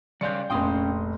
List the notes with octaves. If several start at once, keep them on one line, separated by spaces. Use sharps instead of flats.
C#3 G3 D5 F5 C6 G6 C#7
F1 A#1 C#4 F5 G5 C6 D#6